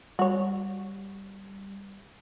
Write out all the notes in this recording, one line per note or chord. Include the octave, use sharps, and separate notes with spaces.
G3 F#4 C#5